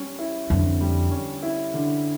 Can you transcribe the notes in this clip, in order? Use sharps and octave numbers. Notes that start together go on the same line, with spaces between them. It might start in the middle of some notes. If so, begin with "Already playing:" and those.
Already playing: G3 C#4
E4
F2 D3
G3
C#4
E4
D3